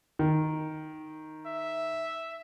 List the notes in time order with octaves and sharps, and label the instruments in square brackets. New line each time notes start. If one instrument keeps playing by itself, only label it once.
[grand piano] D#3
[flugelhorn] E5